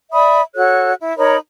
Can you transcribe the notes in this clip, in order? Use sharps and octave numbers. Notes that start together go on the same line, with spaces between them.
D5 E5 B5 D#6
F#4 A4 C#5 F#6
E4
D#4 A#4 C#5 B5